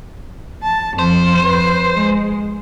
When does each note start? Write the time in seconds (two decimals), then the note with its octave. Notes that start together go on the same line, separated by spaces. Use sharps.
0.64 A5
0.99 F2 C5
1.39 F2 B4
1.94 G#3